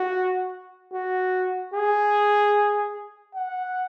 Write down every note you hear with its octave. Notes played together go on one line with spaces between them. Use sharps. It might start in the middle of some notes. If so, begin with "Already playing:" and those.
Already playing: F#4
F#4
G#4
F#5